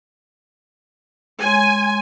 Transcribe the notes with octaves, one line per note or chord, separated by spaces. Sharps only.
G#3 C#5 G#5 C6